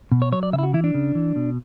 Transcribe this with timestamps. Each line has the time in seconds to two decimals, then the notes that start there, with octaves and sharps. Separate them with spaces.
0.12 B2
0.22 C#5
0.32 F#3 C#5
0.43 D5
0.53 C#3 E5
0.59 E4
0.63 F#4
0.73 E3 E4
0.84 D4
0.94 C#3
1.15 E3
1.36 B2